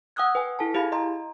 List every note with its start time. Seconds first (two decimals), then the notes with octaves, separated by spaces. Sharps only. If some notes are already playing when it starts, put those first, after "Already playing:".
0.16 F#5 G5 D#6 E6 F#6 G#6
0.35 B4 G5 G#5
0.59 E4 A4 G#5 A5
0.74 E4 G4 G#4 F5 B5 G#6
0.92 D#5 A#5 C6